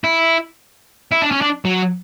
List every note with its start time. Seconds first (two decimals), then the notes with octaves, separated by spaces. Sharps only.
0.04 E4
1.12 E4
1.22 D4
1.31 C#4
1.42 D4
1.65 F#3